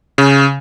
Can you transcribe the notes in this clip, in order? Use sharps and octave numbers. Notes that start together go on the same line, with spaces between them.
C#3